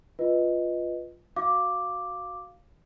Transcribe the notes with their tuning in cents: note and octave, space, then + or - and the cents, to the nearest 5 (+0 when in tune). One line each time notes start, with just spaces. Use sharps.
F4 +0 B4 +0 D#5 +0
F#4 +0 F5 +0 D6 +0